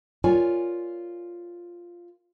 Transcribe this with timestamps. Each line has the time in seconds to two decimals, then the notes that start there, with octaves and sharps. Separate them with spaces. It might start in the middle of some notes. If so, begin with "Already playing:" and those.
0.24 F4 A#4 C#5 D5 G#5